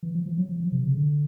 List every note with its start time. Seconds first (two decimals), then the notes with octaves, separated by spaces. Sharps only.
0.03 E3
0.15 F3
0.26 F3
0.38 F#3
0.49 F3
0.60 F3
0.72 C3
0.83 C#3
0.95 D3